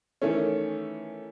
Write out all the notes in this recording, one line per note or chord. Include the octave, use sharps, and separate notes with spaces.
D#3 E3 A3 C#4